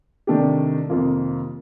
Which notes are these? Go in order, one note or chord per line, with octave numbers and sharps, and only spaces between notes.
C3 D#3 A3 D4 G4
F2 C3 D#3 A#3 F4